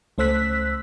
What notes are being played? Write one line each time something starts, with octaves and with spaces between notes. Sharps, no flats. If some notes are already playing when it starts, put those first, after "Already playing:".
C#2 A3 C5 E6 F#6 B6